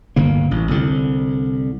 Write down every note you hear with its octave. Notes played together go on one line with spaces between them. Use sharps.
G1 D2 C#3 A#3
A1
C2 D3